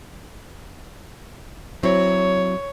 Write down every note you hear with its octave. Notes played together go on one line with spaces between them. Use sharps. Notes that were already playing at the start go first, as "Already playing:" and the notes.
F#3 C4 E4 C#5